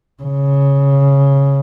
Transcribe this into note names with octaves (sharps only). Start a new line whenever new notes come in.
C#3